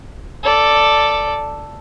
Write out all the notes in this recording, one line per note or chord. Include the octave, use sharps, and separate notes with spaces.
A4 D5